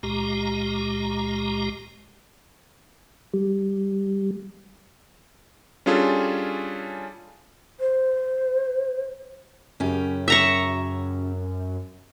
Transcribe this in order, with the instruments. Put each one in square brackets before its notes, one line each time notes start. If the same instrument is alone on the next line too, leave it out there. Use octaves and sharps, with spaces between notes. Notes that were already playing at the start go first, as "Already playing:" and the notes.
[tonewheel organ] C#2 A#2 G#3 G4 A#5
G3
[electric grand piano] G3 C#4 D4 F4 G#4 A4
[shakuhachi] C5
[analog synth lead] F#2 [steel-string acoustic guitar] C#3 C#4 G4
[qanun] E5 A#5 C#6